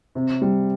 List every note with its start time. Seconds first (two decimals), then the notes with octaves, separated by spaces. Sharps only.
0.15 C3
0.42 G3